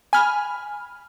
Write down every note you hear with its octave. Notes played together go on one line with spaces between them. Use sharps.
G#5 B5 F6